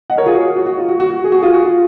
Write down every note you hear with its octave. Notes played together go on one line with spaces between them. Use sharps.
D#5 F#5
A#4 C#5
F4 G#4
F#4
F#4
F#4
F4
F#4
F#4
F#4
G#4
F#4
F4 G#4
F#4
F4